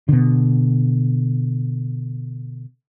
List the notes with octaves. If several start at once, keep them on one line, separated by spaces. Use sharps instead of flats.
B2 D3